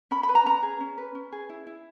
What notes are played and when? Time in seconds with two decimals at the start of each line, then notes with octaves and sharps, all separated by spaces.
0.11 C#4 B5
0.23 B5
0.29 B4
0.35 A#5
0.46 C#4 A#5
0.63 G#4
0.80 C#4
0.98 B4
1.15 C#4
1.32 G#4
1.50 E4
1.67 E4